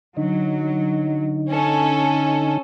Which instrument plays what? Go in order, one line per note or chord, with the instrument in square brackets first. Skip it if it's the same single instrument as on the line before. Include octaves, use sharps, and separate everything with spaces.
[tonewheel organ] D3 D#4 [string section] F#3
[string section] C#4 A4